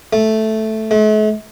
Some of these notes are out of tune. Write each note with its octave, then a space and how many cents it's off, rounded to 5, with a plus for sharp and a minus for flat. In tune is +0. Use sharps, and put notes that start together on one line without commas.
A3 -5
A3 -45